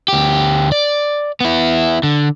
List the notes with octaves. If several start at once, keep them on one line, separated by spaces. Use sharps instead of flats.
D2 G4
D5
B3 E4
D3